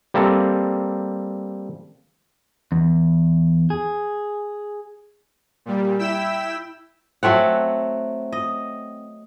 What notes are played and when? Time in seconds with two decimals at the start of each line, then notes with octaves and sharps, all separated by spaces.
0.14 G3 A#3 C4 A4
2.72 E2
3.70 G#4
5.66 A#2 G3
5.99 E4 G5 E6 B6 E7
7.23 F#3 A3 C4 F#5
8.32 D#5